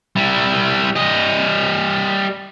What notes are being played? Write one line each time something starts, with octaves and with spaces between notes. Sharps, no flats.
G3 E4
G3 D#5